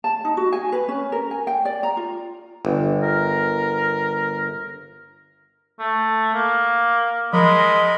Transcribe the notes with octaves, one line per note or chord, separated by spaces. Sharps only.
A5
D#4
F#4
G#5
B4
C#4
A#4
G#5
G5
D5
A#5
F4
G1
A#4
A3
A#3
F3 G#3 A#4 D#5 B5